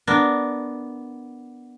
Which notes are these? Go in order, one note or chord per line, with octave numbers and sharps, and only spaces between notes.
B3 D4 A#4